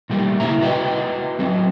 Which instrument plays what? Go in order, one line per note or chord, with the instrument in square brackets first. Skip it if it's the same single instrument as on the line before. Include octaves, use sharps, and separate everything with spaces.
[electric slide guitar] A#2 G3 A3 G4
C#3 E4 E5 A#5
F#4 B4 D#5 G5
F#3 C4